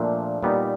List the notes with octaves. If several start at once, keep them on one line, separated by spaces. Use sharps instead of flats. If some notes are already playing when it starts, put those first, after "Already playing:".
Already playing: A#2 F3 A3 D4
A#2 G3 B3 D#4